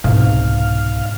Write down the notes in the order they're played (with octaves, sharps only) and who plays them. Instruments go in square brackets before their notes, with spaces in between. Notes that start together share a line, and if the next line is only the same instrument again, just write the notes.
[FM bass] C2 [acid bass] G#2 [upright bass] B2 F#3 [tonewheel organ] F5